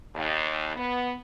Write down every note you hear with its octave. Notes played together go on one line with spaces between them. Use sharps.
D#2
B3